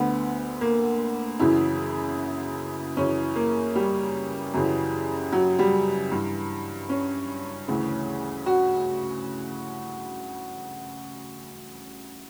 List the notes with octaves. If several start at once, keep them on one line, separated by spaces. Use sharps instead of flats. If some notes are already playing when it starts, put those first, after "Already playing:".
Already playing: D2 D3 B3
A#3
F#2 C#3 E3 E4
F#2 C#3 E3 C#4
A#3
G3
F#2 C#3 E3
F#3
G3
G2 E3
C#4
D2 C#3 E3
F#4